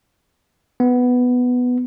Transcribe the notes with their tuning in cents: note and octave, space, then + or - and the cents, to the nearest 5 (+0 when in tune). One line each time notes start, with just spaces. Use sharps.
B3 +5